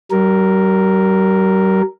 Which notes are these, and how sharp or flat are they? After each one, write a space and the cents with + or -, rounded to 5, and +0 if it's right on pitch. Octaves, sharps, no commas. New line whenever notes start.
G3 -45 A#4 +0